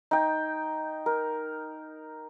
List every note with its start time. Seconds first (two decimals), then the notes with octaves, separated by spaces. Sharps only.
0.11 D#4 G5
1.06 A#4